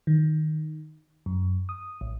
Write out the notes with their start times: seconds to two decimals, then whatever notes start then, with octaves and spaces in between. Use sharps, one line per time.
0.07 D#3
1.26 F#2
1.69 D#6
2.01 A1